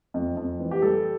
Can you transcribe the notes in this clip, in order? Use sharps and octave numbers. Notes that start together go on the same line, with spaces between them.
F2
F2
E3
G4
G3 A4